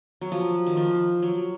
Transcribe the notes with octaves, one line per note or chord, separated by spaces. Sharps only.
F#3
F3
D#3
F3
F#3